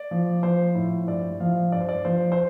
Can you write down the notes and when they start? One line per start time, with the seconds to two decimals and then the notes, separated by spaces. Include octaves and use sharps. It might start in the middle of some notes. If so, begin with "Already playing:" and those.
Already playing: D5
0.11 F3
0.43 F3 C5
0.75 A2
1.08 G2 D5
1.40 F3 F5
1.72 G2 D5
1.80 C5
1.89 D5
2.05 F3 C5
2.32 C5